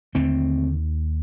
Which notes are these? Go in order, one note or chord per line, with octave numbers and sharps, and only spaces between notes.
D#2 D3 A3 C4